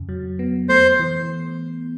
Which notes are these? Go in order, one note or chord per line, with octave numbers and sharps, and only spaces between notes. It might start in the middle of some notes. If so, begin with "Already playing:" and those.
Already playing: F2 C#3
F#3
B3
A3 C5
E3